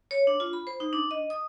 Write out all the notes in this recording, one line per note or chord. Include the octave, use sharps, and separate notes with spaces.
C#5
D4
F4
B5
C5
D#4
D4
D#5
D#6